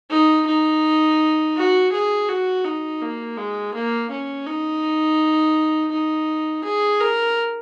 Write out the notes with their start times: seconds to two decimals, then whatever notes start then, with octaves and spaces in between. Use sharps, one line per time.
0.11 D#4
0.47 D#4
1.56 F#4
1.92 G#4
2.29 F#4
2.65 D#4
3.01 A#3
3.37 G#3
3.74 A#3
4.10 C#4
4.46 D#4
5.91 D#4
6.64 G#4
7.01 A#4